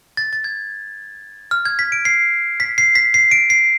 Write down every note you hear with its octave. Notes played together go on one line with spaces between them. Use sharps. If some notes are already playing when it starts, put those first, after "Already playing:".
A6
A6
G#6
F6
G#6
B6
D7
C7
B6
C7
B6
C7
D7
C7